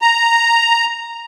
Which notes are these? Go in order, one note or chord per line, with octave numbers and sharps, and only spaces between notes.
A#5